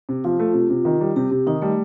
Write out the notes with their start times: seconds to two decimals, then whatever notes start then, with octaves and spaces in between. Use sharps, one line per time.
0.09 C3
0.24 F3 F4
0.40 A3
0.54 C3
0.70 C3
0.85 D#3
1.01 G3
1.16 C3 G4
1.31 C3
1.47 D#3 D#4
1.62 G3 A3